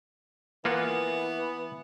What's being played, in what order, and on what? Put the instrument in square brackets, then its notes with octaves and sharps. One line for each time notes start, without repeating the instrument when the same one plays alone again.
[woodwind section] E3 [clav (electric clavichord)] A#3 F4 F#5 [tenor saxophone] B3